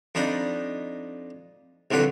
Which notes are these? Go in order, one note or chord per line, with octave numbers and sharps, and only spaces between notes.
F2 D4 D#4 B5
C2 F2 D3 F#3 B4